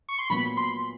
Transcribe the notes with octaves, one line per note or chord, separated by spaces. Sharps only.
C#6
C6
A#2 F#3 B3 B5
C6